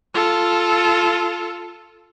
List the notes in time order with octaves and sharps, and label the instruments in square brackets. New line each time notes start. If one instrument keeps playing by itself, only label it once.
[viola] F4 A4